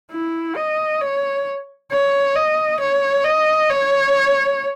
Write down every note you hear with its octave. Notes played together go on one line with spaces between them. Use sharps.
E4
D#5
C#5
C#5
D#5
C#5
D#5
C#5